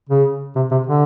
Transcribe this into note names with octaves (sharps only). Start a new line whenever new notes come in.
C#3
C3
C3
D3